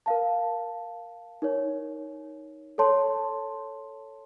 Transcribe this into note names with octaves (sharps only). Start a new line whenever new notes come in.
A#4 F5 A5
D#4 A#4 C#5
A4 C#5 A5 C6